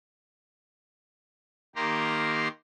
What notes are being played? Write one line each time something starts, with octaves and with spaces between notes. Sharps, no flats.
D#3 A#3 G4 A#5 C6